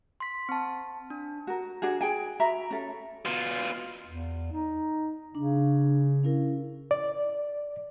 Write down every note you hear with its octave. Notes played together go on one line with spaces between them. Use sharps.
C6 B6
C4 A5
D4
F#4 A#4
D4 F#4 G#4
G#4 G5 G#5
F#4 E5 A#5 B5
C#4 A4
B2 F4
E2
D#4
C#3 D4
C#4 E4 A#4
D5